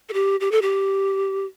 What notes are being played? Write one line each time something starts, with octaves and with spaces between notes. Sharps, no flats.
A4
G4
G4
A4
G4